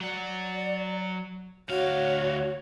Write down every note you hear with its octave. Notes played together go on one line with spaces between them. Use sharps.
F#3 D5 F#5
D2 F#4 C#5 F5